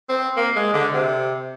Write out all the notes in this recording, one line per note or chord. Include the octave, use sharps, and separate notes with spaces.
C4
A#3
G#3
D3
C3